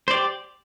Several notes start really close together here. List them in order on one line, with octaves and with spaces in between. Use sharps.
C5 D5 G4